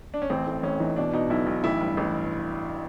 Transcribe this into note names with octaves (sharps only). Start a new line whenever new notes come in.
D4
C#4
A1 C4
A2
A1 C#4
E3 D#4
B2 D4
B2 D#4
B1 E4
B1
A1 E4
G2
A1